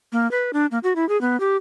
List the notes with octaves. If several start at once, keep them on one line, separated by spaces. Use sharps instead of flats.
A#3
B4
D4
A#3
F#4
E4
G#4
B3
G4